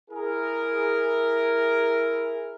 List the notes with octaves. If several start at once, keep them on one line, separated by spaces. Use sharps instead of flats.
E4 G#4 A#4